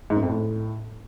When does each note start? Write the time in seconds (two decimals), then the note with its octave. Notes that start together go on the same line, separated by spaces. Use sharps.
0.10 G#2
0.16 F#2
0.22 F2
0.29 A2